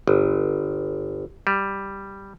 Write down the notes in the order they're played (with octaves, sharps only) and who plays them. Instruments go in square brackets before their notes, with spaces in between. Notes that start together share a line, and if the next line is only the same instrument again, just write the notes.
[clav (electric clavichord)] G1
G3